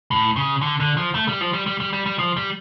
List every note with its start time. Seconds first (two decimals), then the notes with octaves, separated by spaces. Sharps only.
0.11 A2
0.36 C#3
0.62 D3
0.80 D3
0.97 F3
1.15 A3
1.28 G3
1.41 F3
1.53 G3
1.66 G3
1.80 G3
1.93 G3
2.06 G3
2.19 F3
2.37 G3